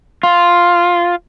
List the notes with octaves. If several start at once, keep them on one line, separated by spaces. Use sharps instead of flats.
F4